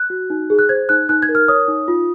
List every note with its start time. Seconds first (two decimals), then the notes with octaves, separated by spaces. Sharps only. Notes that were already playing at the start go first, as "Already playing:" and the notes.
Already playing: F#6
0.10 F#4
0.30 D#4
0.50 G#4
0.59 F#6
0.69 C5 G#6
0.89 D#4 F#6
1.09 D#4 F#6
1.22 G#6
1.29 A#4
1.35 F6
1.48 C#5 D#6
1.68 D#4
1.88 F4